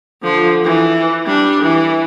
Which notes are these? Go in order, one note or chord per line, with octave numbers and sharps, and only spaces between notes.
D3 F3
E3
G3 D4
E3